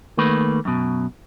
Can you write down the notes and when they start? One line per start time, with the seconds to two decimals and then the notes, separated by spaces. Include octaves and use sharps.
0.17 D#3 A3 A#3 B4
0.65 F#2 B2